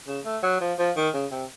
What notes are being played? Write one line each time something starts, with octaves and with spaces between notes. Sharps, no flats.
C#3
A3
F#3
F3
F3
D#3
C#3
C3